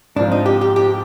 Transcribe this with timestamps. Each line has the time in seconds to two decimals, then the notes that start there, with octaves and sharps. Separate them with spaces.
0.16 G#2 F3 C4 D4 F4
0.31 D#4
0.46 G4
0.61 G4
0.76 G4